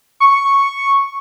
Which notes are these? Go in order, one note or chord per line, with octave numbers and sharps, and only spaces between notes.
C#6